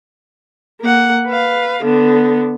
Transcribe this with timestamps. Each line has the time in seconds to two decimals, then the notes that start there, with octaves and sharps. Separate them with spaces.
0.81 A#3 F#5
1.27 B4 F5
1.83 D3 B3